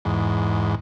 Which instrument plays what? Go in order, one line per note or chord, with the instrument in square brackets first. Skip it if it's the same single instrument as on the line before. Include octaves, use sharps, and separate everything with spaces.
[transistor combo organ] E2 G#2